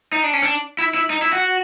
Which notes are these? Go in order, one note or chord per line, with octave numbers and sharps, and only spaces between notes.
D#4
D4
C#4
D4
E4
E4
D#4
E4
F#4